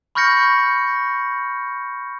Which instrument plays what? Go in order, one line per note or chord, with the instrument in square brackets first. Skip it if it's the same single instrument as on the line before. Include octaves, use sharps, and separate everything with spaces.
[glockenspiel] B5 C#6 F6 G6 A#6 C#7